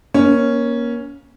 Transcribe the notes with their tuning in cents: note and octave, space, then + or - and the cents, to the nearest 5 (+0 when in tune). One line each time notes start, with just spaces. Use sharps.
A#3 +25 C#4 +0